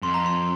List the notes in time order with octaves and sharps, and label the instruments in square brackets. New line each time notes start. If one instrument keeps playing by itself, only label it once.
[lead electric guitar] F2 [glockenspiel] C6
[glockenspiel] A#5
C6